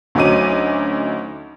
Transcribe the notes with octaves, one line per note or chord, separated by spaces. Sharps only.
D2 F#3 C#4 D#4 D6 D#7